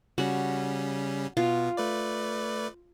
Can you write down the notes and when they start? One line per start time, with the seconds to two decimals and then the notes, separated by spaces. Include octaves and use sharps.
0.18 C#3 G3 C#4 F#4
1.37 B2 B3 F4
1.77 A3 B4 D5